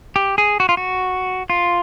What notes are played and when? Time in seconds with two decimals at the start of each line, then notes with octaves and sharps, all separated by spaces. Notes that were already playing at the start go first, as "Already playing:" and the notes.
0.16 G4
0.38 G#4
0.60 F#4
0.69 F4
0.77 F#4
1.50 F4